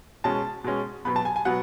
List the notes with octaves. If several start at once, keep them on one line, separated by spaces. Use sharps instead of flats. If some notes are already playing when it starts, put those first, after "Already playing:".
B2 G#3 C#4 A5
B2 G#3 C#4
B2 F#3 B3 B5
A5
G#5
G#5
B2 F#3 B3 F#5